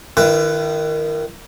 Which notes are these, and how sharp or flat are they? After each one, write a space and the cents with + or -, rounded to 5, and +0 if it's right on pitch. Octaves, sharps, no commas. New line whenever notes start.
D#3 -10 E4 +40 B4 +0